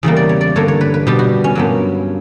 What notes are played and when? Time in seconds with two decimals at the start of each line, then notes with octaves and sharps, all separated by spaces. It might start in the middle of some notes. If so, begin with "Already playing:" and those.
0.03 E2 C#3 G3 A#3
0.16 D5
0.29 C#5
0.41 D5
0.56 G2 D3 A#3 C#5
0.68 C#5
0.81 B4
0.94 B4
1.07 B2 G3 B3 G4
1.19 F#4
1.44 C#4
1.55 G2 F#3 A#3 B3